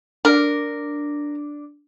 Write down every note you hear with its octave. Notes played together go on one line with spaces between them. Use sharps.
D4 A#4